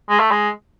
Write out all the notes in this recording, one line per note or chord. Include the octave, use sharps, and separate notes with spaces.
G#3
A3
G#3